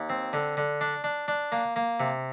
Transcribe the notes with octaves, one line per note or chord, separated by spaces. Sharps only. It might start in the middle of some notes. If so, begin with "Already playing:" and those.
Already playing: D#2
C4
D3
D3
D4
D4
D4
A#3
A#3
C3